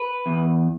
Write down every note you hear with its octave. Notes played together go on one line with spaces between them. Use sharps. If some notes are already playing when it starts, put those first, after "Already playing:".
Already playing: B4
E2